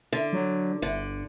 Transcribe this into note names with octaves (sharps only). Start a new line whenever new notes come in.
D3
F#3
G1 D3